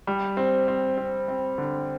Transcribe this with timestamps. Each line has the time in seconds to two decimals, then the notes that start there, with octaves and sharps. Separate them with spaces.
0.07 G3
0.37 C4
0.68 C4
0.98 C4
1.28 C4
1.58 D3